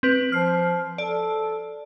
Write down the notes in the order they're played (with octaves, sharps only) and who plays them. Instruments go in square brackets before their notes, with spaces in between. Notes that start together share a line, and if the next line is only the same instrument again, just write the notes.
[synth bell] C4 B4
[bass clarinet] F3 [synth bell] F6 C7
[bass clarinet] A4 [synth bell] D5